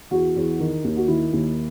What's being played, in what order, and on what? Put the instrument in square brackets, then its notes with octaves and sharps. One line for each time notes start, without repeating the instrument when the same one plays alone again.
[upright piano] E2 F#4
E2
D#3
D#2
F#4
D#3 E4
D#2